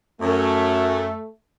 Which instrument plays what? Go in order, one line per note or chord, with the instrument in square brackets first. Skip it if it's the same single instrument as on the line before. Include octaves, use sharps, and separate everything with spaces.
[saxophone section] F#2 [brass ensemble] A3